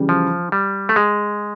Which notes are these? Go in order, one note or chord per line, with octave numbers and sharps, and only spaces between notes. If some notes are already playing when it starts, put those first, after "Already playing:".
Already playing: C#3 E3 G3
F3
G3
A3
G#3